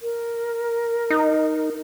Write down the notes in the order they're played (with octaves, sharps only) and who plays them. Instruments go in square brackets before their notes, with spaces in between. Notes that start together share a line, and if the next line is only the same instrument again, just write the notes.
[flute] A#4
[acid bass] D#4